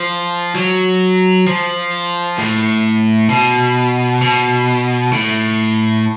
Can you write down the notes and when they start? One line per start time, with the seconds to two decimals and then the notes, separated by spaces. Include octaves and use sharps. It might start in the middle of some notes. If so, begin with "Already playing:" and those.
Already playing: F3
0.55 F#3
1.47 F3
2.38 A2
3.30 B2
4.22 B2
5.12 A2